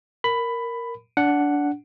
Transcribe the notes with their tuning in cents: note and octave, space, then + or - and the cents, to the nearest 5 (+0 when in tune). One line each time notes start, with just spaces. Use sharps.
A#4 +0 B5 +10
D4 -20 F#5 +0